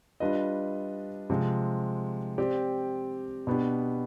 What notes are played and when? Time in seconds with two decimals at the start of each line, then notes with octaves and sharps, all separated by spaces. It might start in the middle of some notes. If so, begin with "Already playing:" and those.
0.20 G3 D4 F4 B4 D#5
1.30 C3 F3 G#3
2.38 C4 G4 D5
3.47 B2 B3 D4 G4